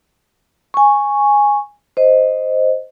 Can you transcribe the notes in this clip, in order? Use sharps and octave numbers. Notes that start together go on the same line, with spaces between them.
G#5 C#6
C5 D#5